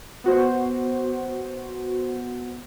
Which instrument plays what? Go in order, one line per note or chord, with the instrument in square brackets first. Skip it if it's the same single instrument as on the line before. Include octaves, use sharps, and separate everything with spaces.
[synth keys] B3 F#4 C5